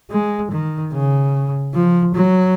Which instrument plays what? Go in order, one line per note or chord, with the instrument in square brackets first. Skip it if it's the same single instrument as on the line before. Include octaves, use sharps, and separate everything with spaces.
[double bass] G#3
D#3
C#3
F3
F#3